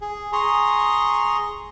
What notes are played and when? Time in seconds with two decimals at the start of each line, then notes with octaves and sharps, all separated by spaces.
0.01 G#4
0.33 G#4 A#5 C6 C#6 D#6